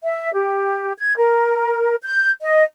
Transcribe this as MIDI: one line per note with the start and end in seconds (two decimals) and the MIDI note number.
0.04 0.32 76
0.34 0.91 67
0.98 1.15 92
1.17 1.95 70
2.03 2.30 91
2.41 2.63 75